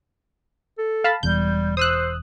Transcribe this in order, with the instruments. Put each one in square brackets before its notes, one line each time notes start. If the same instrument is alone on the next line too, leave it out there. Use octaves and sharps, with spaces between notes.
[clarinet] A4
[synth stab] F5 A5 B5
[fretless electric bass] E1 E2 [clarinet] G3 [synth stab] G6
[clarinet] C5 [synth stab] D#6 E6 F#6